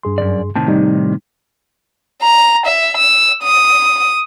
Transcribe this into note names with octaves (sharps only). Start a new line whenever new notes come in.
G2 G#4 C6
F#2 C3 D5
A2 C3 D#3 A5
G3 D#4
A#5
E5
E6
D#6